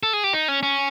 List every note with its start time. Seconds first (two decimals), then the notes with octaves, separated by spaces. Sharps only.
0.03 A4
0.13 G#4
0.24 G4
0.33 D#4
0.48 C#4
0.63 C#4